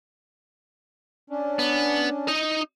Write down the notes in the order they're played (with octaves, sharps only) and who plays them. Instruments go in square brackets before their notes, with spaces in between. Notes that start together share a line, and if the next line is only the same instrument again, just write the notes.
[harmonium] C#4 D4
[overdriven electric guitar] B3
D#4 D#5